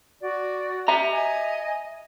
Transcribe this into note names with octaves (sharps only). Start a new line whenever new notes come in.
F#4 D5
E5 A#5
D#5 G#5